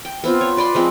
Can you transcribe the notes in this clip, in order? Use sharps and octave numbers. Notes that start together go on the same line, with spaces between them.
G5
B3 C4 F4
C#5
B4 D5 B5 C6
F3 G#3 C4